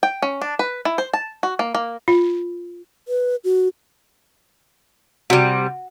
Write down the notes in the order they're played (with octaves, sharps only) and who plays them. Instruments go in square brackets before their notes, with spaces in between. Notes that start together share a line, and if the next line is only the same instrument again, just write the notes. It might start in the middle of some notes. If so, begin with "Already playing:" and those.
[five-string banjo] G5
C#4
D4
B4
E4
C5
A5
F#4
A#3
A#3
[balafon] F4
[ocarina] B4
F#4
[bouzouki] C3 G3 [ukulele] F#4